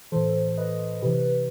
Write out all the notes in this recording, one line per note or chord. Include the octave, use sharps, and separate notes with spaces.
A2 E3 A4 C5
B4 D#5
C3 E3 G4 B4